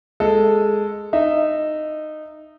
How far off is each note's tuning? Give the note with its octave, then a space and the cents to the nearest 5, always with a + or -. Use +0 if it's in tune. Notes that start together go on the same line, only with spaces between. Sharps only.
G#3 +0 A4 +0 D#5 +5
D#4 -15 E5 +0